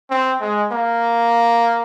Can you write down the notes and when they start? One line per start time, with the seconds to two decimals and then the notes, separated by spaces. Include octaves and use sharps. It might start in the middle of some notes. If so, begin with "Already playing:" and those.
0.10 C4
0.41 G#3
0.72 A#3